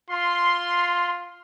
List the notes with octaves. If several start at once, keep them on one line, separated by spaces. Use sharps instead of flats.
F4 C6